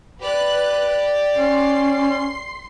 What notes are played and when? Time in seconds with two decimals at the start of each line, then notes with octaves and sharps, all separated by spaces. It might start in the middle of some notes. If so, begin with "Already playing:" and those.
0.21 G4 B4 D5 F#6
1.37 C#4 C6 C7